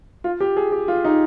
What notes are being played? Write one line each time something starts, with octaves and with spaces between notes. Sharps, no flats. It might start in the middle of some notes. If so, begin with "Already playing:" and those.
F4
G4
G#4
G4
F4
D#4